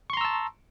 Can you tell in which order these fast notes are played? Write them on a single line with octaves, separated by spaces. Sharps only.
C#6 C6 A#5 E6 A5